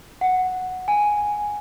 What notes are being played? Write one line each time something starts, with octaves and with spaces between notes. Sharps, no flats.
F#5
G#5